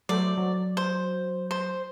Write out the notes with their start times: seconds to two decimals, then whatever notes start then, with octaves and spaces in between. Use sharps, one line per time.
0.09 F#3 A3 C5 D5
0.38 F#3
0.77 C5
1.51 C5